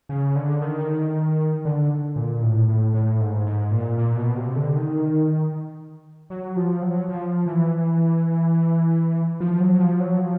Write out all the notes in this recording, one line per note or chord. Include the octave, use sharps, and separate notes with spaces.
C#3
D3
D#3
D3
A#2
A2
A2
A2
G#2
G#2
A#2
A#2
B2
C3
D3
D#3
F#3
F3
F#3
F3
E3
F3
F#3
F3
F#3
F3